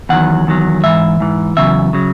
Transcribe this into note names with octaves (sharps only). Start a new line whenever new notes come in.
E2 D#3 F#3 F#5
E2 D#3 F#3
G#2 E3 E5
G#2 E3
E2 C#3 F#3 E5
C#3 F#3